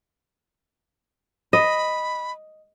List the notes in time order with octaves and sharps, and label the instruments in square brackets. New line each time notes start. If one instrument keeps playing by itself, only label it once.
[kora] D#5 [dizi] B5